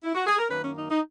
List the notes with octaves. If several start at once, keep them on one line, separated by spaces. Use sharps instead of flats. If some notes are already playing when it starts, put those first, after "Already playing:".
E4
F#4
G#4
A#4
F#2 D#3 A#3 C#4 B4
C#4
D#4
D#4